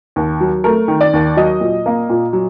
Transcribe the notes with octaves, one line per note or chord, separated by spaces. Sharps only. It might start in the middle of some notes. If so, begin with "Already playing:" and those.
D#2
F#3
A3 A#4
D#3
D5
D#2
F#3 D#5
A#2
A#3
A#2
F#3